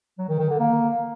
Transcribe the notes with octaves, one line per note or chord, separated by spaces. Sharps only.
F#3
D#3
D#3
D3
A#3